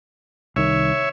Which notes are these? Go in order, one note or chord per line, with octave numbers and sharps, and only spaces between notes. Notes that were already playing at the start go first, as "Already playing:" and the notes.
C2 D#3 C#5 E5